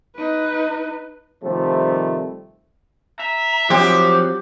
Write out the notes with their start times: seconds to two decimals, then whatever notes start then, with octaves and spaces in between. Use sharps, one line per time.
0.16 D#4 B4
1.43 C3 D#3 F3 G3 A3
3.20 E5 A#5
3.70 F3 F#3 C4 G4 C5 F#5